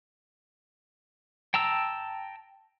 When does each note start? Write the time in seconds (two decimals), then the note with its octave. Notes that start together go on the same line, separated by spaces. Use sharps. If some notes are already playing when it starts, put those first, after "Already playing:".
1.54 G5 A5 A#5 E6